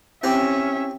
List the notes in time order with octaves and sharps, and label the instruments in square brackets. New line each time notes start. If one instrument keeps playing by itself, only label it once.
[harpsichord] C4 E4 G4 [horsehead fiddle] C#4 E5